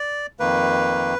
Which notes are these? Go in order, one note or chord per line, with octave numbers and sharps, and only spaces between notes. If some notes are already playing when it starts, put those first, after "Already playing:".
Already playing: D5
F2 D#3 A#3 B4